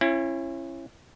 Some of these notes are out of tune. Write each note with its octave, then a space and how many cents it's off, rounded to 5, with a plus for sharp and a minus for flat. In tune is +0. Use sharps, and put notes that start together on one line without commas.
C#4 -30 E4 +30